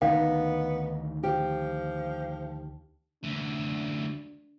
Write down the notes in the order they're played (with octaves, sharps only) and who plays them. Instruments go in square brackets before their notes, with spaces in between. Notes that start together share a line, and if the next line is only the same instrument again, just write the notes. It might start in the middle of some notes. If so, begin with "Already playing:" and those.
[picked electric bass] D2 D#3 [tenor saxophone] B3 [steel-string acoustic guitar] D#4 [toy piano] F5
[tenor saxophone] F3 [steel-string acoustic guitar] G4
[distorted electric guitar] D2 E3 [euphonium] D4